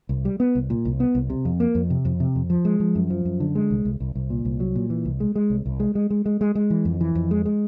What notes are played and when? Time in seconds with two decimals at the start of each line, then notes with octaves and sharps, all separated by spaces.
0.09 C2
0.25 G3
0.40 B3
0.55 C2
0.70 A#2
0.85 C2
1.00 B3
1.15 C2
1.30 C3
1.45 F2
1.60 A#3
1.75 F2
1.90 C3
2.05 F2
2.20 C3
2.35 F2
2.50 F3
2.65 G#3
2.80 F3
2.95 F#2
3.10 F3
3.25 F#2
3.40 D3
3.55 G#3
3.71 C2
3.85 C2
4.00 C2
4.15 C2
4.30 A#2
4.45 C2
4.60 F#3
4.75 A#2
4.90 E3
5.05 C2
5.20 G#3
5.35 G#3
5.50 C2
5.66 C2
5.80 G#3
5.95 G#3
6.10 G#3
6.26 G#3
6.41 G#3
6.55 G#3
6.70 E3
6.85 F2
7.01 E3
7.15 F2
7.31 G#3
7.45 G#3